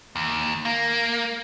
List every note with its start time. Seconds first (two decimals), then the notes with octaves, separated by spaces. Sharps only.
0.16 D#2
0.65 A#3